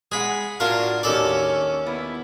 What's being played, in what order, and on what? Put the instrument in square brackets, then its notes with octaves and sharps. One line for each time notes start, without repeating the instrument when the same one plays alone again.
[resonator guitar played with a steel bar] G#3 F#5 [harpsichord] G#4 B5
[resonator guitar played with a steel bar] A2 D4 F#4 [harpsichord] F4 A#4 F5
[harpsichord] D#2 A4 D5 [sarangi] C#4
[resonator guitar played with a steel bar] B3 [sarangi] E4